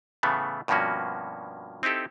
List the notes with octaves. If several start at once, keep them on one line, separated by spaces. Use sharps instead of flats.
A2 C#3 E3 A3 B3
G2 B2 F3 A#3 C#4 F#4
C4 D#4 E4 G4 A4